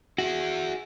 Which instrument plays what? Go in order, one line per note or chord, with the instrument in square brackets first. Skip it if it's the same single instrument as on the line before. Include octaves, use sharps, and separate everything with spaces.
[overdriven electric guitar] E4 G#4 [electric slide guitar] F#4